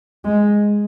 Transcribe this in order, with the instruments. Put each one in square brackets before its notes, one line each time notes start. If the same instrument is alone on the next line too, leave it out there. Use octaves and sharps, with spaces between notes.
[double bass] G#3